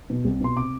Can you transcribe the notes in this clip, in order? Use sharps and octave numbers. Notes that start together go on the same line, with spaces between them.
B2
C2
B2 C6
C3 D6